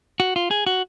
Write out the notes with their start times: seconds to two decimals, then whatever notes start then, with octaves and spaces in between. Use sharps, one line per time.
0.20 F#4
0.36 F4
0.51 G#4
0.66 F#4